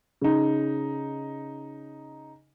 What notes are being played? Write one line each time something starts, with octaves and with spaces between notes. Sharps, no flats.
C#3 D#4